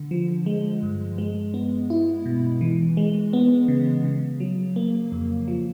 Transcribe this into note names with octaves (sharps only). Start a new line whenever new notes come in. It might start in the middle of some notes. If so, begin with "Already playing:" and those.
Already playing: D3
F3
G#3
G2
G#3
B3
E4
B2
E3
G#3
B3
C#3
C#3
F#3
A#3
F2
F3